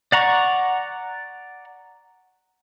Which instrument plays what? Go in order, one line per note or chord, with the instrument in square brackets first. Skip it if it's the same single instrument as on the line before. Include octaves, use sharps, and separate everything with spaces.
[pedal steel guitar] D5 F#5 A#5 C#6